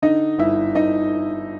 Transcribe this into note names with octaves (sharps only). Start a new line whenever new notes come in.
D3 D#4 D#5
G1 E4 E5
G1 D#4 D#5